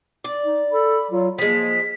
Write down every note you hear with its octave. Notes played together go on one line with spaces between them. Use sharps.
D5
D#4
A4 B5
F#3 F4
F3 G#3 A#3 B6